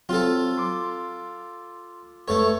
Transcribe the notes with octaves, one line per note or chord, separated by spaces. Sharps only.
F#3 C4 F4 A4
C6 D6
F2 A3 A4 B4 C#5